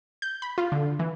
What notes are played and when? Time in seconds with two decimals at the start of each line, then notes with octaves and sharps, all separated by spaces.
0.22 G6
0.42 B5
0.58 F4
0.72 D3
0.99 E3